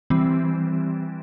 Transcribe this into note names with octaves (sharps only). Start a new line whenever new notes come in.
E3 G3 C4